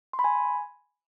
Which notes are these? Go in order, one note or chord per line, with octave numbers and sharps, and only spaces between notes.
C6
B5
G#5